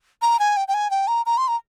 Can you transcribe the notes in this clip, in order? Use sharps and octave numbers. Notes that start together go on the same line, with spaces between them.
A#5
G#5
G5
G5
G#5
G5
A#5
A#5
C6
A#5